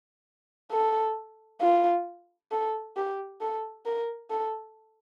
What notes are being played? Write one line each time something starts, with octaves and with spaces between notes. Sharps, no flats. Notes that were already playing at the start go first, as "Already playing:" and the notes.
A4
F4
A4
G4
A4
A#4
A4